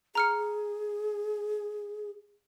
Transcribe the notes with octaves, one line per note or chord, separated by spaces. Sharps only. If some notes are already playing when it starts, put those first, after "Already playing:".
G#4 A#5 F6 C#7